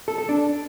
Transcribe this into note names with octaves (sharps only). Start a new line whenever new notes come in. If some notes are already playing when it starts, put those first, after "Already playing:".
A4
A4
D4